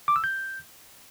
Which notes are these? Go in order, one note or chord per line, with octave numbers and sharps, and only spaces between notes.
D6
E6
G6